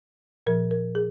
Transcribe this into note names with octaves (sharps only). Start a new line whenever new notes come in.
A#2 F3 A#4
A#4
G#4